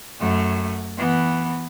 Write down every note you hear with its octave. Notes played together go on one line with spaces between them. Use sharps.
F#2 A3
E3 B3